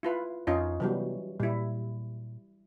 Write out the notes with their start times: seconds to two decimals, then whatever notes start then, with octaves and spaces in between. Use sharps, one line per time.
0.03 E4 F4 B4
0.47 F2 C#4 D#4 F4
0.80 C3 E3 F#3 G3 B3
1.40 A#2 G3 E4